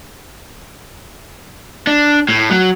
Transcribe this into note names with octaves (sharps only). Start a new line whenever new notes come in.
D4
A2
F#3